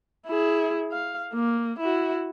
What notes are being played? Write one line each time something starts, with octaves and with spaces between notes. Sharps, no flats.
E4 G#4
F5
A#3
E4 F#4